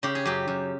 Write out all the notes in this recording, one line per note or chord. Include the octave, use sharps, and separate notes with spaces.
C#3 G4
G#4
F#2 G4
F#2